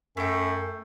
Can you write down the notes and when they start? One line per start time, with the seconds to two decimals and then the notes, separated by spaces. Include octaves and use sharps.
0.17 F#2 A3 G5